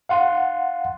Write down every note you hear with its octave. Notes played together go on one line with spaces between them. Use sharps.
F5 F#5 C6